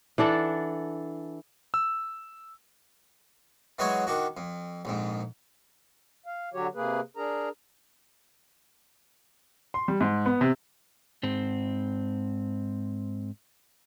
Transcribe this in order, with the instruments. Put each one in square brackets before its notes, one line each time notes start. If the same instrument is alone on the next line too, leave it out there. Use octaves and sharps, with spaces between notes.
[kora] E3 D4 A4 F#5
[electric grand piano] E6
[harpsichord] E3 F#3 G#3 F#4 G#4 C#5
D#3 D4 F#4
F2
A#1 F2 G#2
[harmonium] F5
D3 F#3 F#4 G4 C#5
C3 A#3 G#4 B4
D4 G#4 A#4 A#5
[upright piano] C6
G3
G#2
B3
C3
[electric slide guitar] G#2 C4